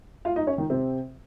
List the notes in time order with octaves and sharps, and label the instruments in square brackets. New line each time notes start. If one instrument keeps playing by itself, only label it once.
[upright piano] F4 F5
D#4 D#5
C#4 C#5
D#3 D#4
C3 C4